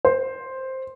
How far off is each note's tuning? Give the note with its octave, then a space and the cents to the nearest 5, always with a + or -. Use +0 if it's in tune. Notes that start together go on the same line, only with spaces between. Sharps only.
C5 +5